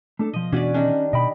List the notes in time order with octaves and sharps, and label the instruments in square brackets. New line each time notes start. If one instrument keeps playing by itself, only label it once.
[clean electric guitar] A3 D4 A4
[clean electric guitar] B2 F3 [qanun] D#5
[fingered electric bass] B2 E3 B3 [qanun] C#4 B4 D5 [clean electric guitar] D4 F#4
[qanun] D#3 G3 D4 [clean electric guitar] C#4 D#5
[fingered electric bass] B2 [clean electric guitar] D#5 G5 B5